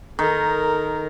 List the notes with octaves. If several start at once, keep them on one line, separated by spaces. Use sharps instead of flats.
D#3 A4 A#4